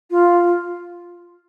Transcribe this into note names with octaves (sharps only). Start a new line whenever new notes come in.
F4